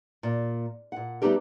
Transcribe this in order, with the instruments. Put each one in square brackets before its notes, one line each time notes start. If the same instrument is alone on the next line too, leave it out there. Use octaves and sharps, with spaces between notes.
[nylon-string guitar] A#2
A#2 F#5
G3 A3 B3 D#4 G4 A#4